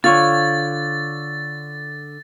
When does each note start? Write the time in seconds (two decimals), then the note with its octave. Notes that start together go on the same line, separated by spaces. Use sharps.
0.04 D3 F4 C#5 A6